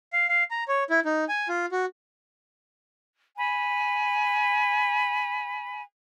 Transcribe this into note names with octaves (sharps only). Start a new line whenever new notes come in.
F5
F5
A#5
C#5
E4
D#4
G#5
F4
F#4
G#5 B5